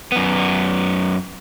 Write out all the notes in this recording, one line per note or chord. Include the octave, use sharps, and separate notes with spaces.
F#2 B3